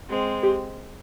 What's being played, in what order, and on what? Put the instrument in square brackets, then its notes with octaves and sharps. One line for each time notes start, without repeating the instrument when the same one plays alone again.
[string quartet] G#3 C4
[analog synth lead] G4